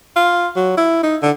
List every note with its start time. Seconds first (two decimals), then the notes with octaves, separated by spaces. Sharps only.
0.16 F4
0.56 F#3
0.77 E4
1.03 D#4
1.22 D3